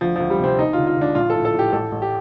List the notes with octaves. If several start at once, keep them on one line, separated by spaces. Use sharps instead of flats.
D2 F3
D2 F3
G3
C3 C4
D#2 D#4
F4
D3
F4
D3 D4
A#1 F4
A2 A4
A4
A2 G4
A1 A4
A1
G4